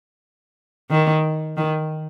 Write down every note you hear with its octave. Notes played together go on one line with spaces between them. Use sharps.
D#3
D#3